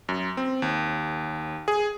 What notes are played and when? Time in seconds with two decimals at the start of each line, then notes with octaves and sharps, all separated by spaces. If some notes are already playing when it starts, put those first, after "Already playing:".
0.09 F#2
0.37 C4
0.62 D#2
1.68 G#4